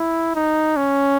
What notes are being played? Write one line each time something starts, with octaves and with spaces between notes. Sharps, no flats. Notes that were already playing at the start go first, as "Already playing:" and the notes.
Already playing: E4
D#4
C#4